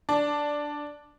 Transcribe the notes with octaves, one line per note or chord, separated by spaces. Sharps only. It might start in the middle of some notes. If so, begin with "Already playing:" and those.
D4